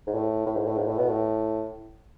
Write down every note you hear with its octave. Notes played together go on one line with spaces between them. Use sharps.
G#2
A2
A2
G#2
A2
G#2
A2
B2
A2